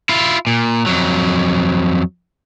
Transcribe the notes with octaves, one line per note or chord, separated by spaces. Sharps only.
E4 F4
A#2
F2 F#3